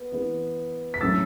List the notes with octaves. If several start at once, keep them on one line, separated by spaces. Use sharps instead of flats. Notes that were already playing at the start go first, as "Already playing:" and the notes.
Already playing: B3
E3 B3
B6
A2 F#3 A3 C#4 E6 A6